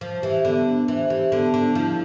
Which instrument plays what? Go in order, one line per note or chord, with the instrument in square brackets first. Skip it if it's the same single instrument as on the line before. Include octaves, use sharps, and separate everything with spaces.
[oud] F3 [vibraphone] C5
[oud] E3 [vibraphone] G4
[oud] D3 [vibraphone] B3
[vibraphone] D4
[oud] E3 [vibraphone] C5
[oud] E3 [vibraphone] G4
[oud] D3 [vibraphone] B3
[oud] D3 [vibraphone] D4
[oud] F3 [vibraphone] E4